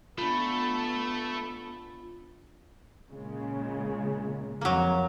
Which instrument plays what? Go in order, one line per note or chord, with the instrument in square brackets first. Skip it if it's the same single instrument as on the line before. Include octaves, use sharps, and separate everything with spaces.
[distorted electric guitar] A3 [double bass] B3 [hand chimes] D4 F4 [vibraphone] B5
[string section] A#2 C#3 G#3
[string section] F2 [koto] F#3 A#3